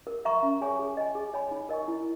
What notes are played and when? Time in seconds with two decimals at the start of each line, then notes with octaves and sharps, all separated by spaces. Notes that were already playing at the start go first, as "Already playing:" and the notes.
0.07 A#4
0.25 E5 A#5 C#6
0.43 C#4
0.61 G#4 C#5 G#5 C#6
0.79 G#4
0.97 D#5 G#5
1.15 G#4
1.34 C#5 G#5 B5
1.51 D#4
1.69 A#4 D#5 G#5 C#6
1.88 E4